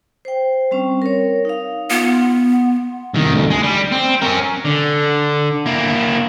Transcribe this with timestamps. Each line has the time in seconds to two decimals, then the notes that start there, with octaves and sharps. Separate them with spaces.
0.25 C5 G5
0.71 G3 C4 C#4
1.02 A#4 C#5
1.45 D#4 F5
1.90 B3 F4
2.13 F#5 C6
3.14 C2 D#3
3.34 D2
3.50 G#3
3.63 G3
3.92 C4
4.22 C#4 A#4
4.65 D3
5.66 A#3 E4